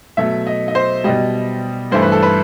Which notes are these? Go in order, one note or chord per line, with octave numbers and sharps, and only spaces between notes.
B2 F#3 A3 E5
D#5
D#5
C5
B2 G3 D#5
G2 E3 A3 C5
B4
A4
B4